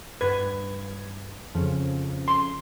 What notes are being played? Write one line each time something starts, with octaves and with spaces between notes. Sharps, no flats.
G2 B4 G#6
F2 C#3
C6